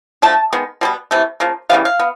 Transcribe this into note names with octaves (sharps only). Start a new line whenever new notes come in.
D3 F3 A3 A5
D#3 G#3 B3
B2 G3 B3
C3 E3 A3
C#3 F3 A#3
C#3 E3 G3 B3 F5
F5
B3